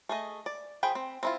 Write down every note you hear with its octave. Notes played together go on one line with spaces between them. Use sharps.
A3 G#4 D#5
D5
F3 G#4 G5 B5
C4
C4 E4 F4